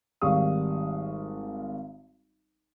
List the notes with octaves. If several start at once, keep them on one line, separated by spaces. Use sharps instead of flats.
G#1 G3 F5 C#6 D#6